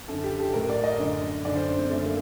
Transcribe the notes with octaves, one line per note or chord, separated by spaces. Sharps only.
F#2 D3 A4
G4
A4
A2 A#4
D5
D#5
F#2 D3
F#2 D3 D5
C5
D4
C4
F#2 D3 A3
A#3